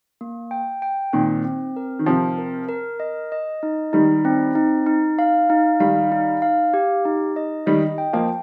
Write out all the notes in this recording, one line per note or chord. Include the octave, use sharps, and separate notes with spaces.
A#3
G5
G5
A#2 D#3 C4
C4
A#4
D#3
C3 F3 C4
A#4
A#4
D#5
D#5
D#4
D#3 G3 D#4
C4
D#4
D#4
F5
D#4
D#3 G3 F5
D#4
F5
G4
D#4
D#5
D#3 G3 D#5
G5
F3 A#3